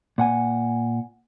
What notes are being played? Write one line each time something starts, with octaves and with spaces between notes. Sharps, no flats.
A#2 F#5 G#5